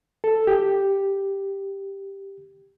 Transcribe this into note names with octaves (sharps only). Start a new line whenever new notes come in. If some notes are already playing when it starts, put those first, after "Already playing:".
A4
G4